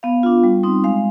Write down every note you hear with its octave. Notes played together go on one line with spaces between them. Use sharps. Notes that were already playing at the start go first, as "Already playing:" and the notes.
B3 F5
D4 F4
G3
C4 D#4
G#3 F5